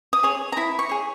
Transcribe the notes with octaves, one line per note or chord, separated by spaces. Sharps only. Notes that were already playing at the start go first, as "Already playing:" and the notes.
D#6
G#4 C#5
A#5
E4 B5
C#6
G#4 C#5